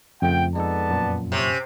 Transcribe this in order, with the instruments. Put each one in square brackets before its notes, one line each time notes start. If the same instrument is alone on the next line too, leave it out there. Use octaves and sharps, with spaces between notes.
[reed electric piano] F2 [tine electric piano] C#3 F3 A3 [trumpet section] F#5 G5
[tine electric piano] G#3 D#4 A4 [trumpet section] B3 D5 A5
[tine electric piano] F#2 A#2
[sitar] C3 [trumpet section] C#4